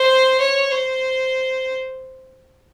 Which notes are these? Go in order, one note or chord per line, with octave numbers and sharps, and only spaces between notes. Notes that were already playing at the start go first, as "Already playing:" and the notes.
Already playing: C5
C#5
C5